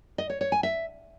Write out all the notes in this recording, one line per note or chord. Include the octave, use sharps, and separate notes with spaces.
D#5
C#5
C#5
G#5
E5